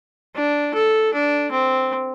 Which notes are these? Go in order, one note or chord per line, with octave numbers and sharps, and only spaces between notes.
D4
A4
D4
C4